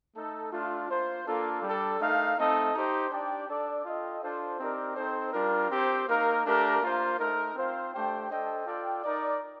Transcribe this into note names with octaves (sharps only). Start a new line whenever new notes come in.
A3 D#4 A4
A3 D4 F4
A#3 F4 C5
A#3 D4 F4 A4
G3 D4 A4
A3 D#4 A#4 F5
A3 C4 D#4 A4 D#5
D#4 G4 C5
D4 G4 D5 G5
D4 A4 D5
F4 A4 D#5 G5
D4 F4 A4 C5
C4 D#4 G4 A#4 D5
C4 D#4 A4 C5
G3 D4 F4 A#4
C4 G4 C5
A#3 D#4 A#4 F5
A3 D4 G4 A#4
A#3 F4 C5
A3 D#4 A#4
C4 F4 C5 F5
A3 D4 G4 C5 G5
D4 A4 C5 D#5 G5
F4 A4 D5 G5
D#4 A#4 D5